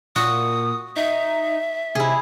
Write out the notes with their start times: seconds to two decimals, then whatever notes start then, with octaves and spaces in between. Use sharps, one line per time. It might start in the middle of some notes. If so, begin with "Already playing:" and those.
0.16 A#2 F#4 D#6
0.96 D#4 E5
1.95 C3 E4 G#4